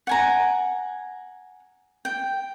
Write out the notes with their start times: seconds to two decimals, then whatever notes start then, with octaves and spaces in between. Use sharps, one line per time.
0.07 F#5 G#5 A#5
2.05 G5